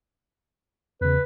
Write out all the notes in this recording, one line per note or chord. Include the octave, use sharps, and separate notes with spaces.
E2 C#3 B4